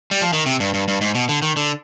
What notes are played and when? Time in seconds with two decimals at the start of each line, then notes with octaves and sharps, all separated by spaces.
0.11 G3
0.21 F3
0.33 D#3
0.46 C3
0.60 G2
0.74 G2
0.88 G2
1.01 G#2
1.15 B2
1.29 D3
1.42 D#3
1.57 D3